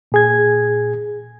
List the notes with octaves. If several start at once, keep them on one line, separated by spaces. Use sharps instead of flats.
A#2 G#4 G#6